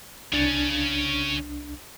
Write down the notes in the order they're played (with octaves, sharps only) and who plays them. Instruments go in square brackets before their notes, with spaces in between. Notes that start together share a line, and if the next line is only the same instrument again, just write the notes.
[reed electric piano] C2 D4 A6 [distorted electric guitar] C#3 C#4